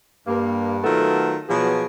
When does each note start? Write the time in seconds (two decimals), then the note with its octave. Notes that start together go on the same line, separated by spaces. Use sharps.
0.27 G2 A#3
0.83 D#3 F#3 A3 B3 F4 A4
1.49 B2 F3 F#3 B3 G#4